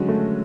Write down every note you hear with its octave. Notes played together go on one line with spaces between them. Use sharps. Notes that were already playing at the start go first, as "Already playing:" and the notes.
Already playing: D3 F#3 G#3 C#4 F#4
A3